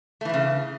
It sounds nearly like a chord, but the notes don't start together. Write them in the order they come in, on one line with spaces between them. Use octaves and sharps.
A3 E3 A2 C#3